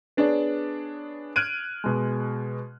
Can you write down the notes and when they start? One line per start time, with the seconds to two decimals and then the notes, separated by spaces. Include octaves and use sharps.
0.17 B3 D4 G#4 C#5 D5
1.36 F6 F#6 G#6 D7 D#7
1.84 B2 G#3